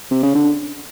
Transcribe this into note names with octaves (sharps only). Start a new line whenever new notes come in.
C3
C#3
D3